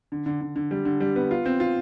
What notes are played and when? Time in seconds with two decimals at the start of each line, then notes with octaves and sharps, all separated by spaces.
0.12 D3
0.26 D3
0.41 D3
0.56 D3
0.71 G3
0.85 D3
1.00 G3
1.16 B3
1.31 F4
1.46 C4
1.60 F4